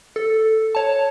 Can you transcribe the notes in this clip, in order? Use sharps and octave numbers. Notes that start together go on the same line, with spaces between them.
A4
C#5 A5